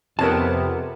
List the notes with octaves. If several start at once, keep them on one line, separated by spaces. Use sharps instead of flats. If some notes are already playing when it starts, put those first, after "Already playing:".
F2 C3 B3 A#4 C#5 A5